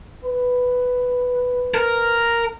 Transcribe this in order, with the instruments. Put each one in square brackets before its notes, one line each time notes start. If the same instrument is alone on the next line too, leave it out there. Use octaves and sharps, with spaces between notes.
[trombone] B4
[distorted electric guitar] A#4